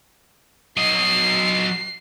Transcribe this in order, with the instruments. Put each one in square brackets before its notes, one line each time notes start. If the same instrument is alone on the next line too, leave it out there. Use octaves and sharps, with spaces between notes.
[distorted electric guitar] F#3 D#5 [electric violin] C7